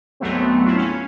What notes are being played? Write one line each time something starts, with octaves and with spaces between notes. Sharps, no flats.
D2 G#2 F#3 A3 B3 C4
F#3 A3 E4 F4
C#4